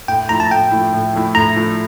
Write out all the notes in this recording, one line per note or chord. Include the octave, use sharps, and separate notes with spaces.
A2 G5
F3 A3 E4 A#5
A5
A2 G5
F3 A3 E4
A2
F3 A3 E4
A2 A#5
F3 A3 E4